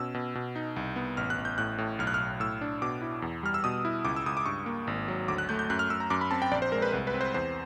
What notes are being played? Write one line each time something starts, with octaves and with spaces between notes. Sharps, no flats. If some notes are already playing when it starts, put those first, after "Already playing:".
Already playing: B2 C#4 E6
B2
B2
D#4
C2
B3
A1 F6
F#6
A1
G6
A2 F#6
A2
B1 F6
F#6
F6
B1
A2 E6
D4
B2 D6
E4
E2
G3 F6
E6
B2 D#6
E4
C#2 D6
E6
C#2 D#6
D6
G2 C#6
A#3
G#1
F#3
D2 D6
F#6
A3 G6
G6
F#2 F#6
F6
F#2 E6
A#5
F#2 D6
B5
C4 A5
G5
A#1 D5
C5
G#3 A#4
B4
C2 B4
B4
C4
C5
E2 C5